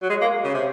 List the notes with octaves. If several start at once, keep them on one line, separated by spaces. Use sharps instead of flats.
F#3
G#3
A#3
C#3
C3